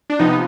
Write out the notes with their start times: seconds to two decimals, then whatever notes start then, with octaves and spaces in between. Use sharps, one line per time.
0.10 D4
0.19 C3 F3 B3 D#4